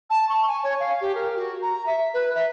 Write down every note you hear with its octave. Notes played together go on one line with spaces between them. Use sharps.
A5
C#6
G#5
C#5
F5
G4
A#4
F#4
A#5
E5
B4
E5